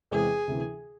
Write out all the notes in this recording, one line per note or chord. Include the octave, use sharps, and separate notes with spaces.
E2 C3 G#3 C4 E4 G#4
D2 C3 E3